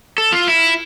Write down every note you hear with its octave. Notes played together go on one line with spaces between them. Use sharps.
A4
F4
E4